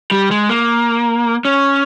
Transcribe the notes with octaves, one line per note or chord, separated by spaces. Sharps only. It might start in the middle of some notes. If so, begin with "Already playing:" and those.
G3
G#3
A#3
C#4